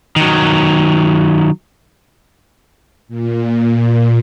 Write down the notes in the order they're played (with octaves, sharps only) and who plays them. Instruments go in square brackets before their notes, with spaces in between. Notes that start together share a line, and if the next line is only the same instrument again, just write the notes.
[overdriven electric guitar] D#3 F#3
[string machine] A#2